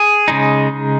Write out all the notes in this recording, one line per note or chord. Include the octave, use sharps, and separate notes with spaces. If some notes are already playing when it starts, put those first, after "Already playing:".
Already playing: G#4
C#3 G#3 D#4